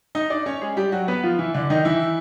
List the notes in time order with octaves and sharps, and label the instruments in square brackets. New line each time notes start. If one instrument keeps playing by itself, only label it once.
[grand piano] D#4 D#5
D4 D5
C#4 C#5
G#3 G#4
G3 G4
F#3 F#4
B3 B4
F3 F4
E3 E4
D3 D4
D#3 D#4
E3 E4